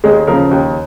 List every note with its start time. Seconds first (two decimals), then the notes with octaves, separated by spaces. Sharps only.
0.04 D#2 G#3 G#4
0.27 C#3 F3 A#3 A#4
0.51 D#2